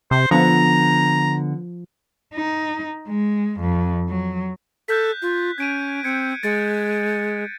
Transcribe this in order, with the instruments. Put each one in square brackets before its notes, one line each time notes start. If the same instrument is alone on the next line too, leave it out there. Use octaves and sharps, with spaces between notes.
[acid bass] C3 [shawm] C5
[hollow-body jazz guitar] D3 B3 [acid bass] F3 [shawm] A#5
[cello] D#4
G#3
F2
F#3
[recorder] A4 [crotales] F#6 G6 B6
[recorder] F4
[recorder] C#4 [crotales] G#6 D7 D#7
[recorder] C4 [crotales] G#6 C#7
[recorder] G#3 [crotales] A6 C#7